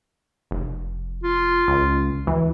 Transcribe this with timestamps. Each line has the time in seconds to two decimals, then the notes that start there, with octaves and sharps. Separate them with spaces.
0.51 F1
1.23 F4
1.68 C#2
2.27 D2 E3